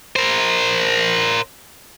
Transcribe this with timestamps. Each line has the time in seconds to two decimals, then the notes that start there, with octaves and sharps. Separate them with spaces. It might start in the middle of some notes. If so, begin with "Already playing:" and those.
0.16 A#4 C5